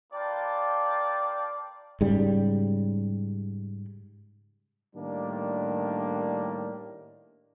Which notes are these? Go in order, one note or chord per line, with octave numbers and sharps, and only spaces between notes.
A#3 F4 B4 D5 G5 A5
G#2 C#3 G3
A2 D#3 G3 A#3 D4